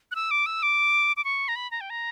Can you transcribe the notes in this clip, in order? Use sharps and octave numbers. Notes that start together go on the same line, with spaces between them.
F#6
E6
D6
E6
D6
D6
C#6
A#5
B5
A#5
G5
A#5